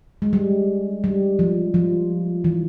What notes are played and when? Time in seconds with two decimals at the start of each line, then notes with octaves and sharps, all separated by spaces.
0.22 G#3
0.33 G3
1.04 G3
1.39 F3
1.74 F3
2.44 E3